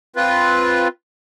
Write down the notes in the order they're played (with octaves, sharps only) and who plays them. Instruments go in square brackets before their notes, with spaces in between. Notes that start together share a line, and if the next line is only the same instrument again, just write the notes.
[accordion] C4 F4 B4